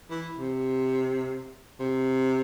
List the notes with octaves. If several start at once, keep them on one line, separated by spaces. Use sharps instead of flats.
E3
C3
C3